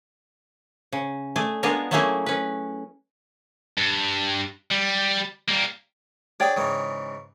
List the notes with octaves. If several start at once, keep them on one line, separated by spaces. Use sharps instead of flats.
C#3
A3 G#4 D5
G#3 B3 D4 F4 G#4 A#4
F#3 A3 A#3 C#4 E4 G#4
C#4 B4
G2
G3
G3 A#3
D4 G#4 C#5 D5 G5
G#2 C#3 E3